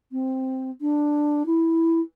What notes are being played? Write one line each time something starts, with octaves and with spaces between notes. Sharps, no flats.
C4
D4
E4